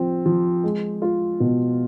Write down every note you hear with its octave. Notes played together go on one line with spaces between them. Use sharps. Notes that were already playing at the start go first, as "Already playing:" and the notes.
Already playing: F3 C4
F3
G#3
F4
B2